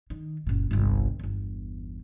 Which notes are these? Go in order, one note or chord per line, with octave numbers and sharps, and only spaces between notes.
D#3
F#1 A#2
G1 C2
G1 E2